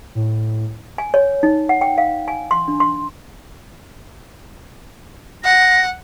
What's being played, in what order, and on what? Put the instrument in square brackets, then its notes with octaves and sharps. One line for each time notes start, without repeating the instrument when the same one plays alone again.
[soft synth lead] A2
[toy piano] G#5
C#5
D#4
F#5
G5
F5
G#5
C6
D4
C6
[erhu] F#5 [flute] A#6